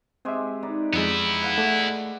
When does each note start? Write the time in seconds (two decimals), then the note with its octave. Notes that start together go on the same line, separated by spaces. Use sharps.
0.25 G#3 C4 G4 G#4 E5
0.63 D#4 B4 D5
0.94 F2 G#3 B3 E4
1.43 B4 F5 F#5
1.58 A3 D5